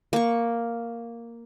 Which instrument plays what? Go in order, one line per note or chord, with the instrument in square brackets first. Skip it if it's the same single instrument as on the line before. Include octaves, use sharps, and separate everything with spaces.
[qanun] A#3 C#6